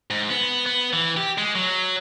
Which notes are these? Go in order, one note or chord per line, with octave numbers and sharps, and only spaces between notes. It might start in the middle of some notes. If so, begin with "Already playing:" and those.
G#2
B3
B3
E3
G4
G#3
F#3